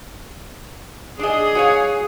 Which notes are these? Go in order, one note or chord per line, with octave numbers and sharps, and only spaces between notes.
D4 G#4 D#5
F#4 C#5 F5